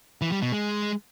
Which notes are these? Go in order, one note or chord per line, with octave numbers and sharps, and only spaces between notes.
E3
G3
B2
G#3